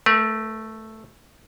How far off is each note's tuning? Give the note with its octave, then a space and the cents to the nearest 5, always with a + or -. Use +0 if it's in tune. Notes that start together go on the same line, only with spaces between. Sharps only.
A3 +0 A#4 +45